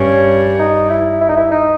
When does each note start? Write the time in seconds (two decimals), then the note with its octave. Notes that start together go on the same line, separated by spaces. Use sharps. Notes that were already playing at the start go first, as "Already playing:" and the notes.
Already playing: G2 C#4
0.59 D#4
0.90 E4
1.21 E4
1.29 D#4
1.37 E4
1.51 D#4